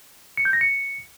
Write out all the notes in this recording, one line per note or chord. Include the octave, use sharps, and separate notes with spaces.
C#7
G6
A#6
C#7